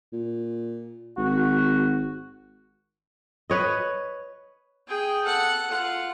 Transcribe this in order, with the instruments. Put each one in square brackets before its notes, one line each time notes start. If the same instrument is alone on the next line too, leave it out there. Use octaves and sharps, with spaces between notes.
[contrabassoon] A#2
[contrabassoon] G#1 [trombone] F#4
[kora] B4 C#5 D#5
[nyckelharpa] G#4 G5
A4 F#5
F4 F#5